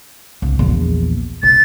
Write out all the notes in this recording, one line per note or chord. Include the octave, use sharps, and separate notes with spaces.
C2
A#1 E2
B1 A6